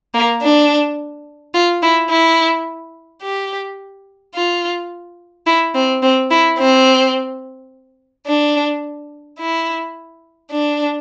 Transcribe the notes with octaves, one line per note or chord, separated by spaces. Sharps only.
A#3
D4
F4
E4
E4
G4
F4
E4
C4
C4
E4
C4
D4
E4
D4